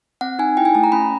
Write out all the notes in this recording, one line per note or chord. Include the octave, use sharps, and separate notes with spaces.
C4 F#5
D#4 G#5
E4 G5
G#5
A3 A5
A#5
C#4 B5